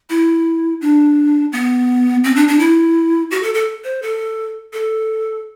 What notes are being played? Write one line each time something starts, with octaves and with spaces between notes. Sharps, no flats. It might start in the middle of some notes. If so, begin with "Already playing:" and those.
E4
D4
B3
C4
D4
D4
E4
F#4
A4
A4
C5
A4
A4